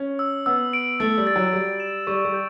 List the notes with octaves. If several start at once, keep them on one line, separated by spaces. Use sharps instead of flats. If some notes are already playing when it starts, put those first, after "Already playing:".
Already playing: C#4
E6
B3 E6
D7
A3 A6
G3
A6
F#3
G3 A6
E7
G3 C#6
G3
G6